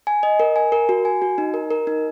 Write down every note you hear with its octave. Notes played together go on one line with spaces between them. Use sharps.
G#5
D#5
A#4
G#5
A#4
F#4
G#5
F#4
D#4
A#4
A#4
D#4